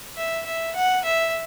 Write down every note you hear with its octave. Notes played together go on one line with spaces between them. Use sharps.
E5
E5
F#5
E5